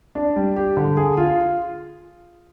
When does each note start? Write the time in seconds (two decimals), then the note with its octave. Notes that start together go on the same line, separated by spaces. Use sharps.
0.15 D4
0.36 G3
0.56 G4
0.77 D3
0.97 G#4
1.17 F4